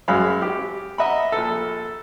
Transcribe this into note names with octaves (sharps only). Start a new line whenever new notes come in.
F#2 F#3 G#3 F5 B5
G4
D#5 E5 F#5 A#5 B5
A#1 A4